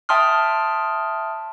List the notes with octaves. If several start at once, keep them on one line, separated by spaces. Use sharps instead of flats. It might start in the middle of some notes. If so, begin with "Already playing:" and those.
E5 G5 A5 C6 D#6 F6